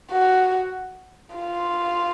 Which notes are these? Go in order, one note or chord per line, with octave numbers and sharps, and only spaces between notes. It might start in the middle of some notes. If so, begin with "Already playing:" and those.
F#4
F4